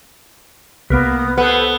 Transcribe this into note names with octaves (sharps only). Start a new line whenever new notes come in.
C2 A#3 B3 A#4 B4
B3 A4 B4 C5